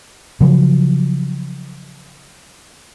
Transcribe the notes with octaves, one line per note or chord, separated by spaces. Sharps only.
C#3 F3 F#3